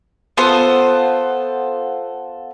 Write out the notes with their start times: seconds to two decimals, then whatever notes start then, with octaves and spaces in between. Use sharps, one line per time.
0.37 B3 F4 A4 C5